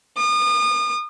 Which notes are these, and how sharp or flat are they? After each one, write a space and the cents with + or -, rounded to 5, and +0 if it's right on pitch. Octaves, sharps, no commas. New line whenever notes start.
D#6 -35